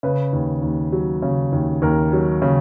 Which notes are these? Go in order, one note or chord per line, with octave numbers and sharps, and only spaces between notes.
C#3 B4
D#2
D#2
F#3
C#3
D#2
D#2 A#4
F#3
C#3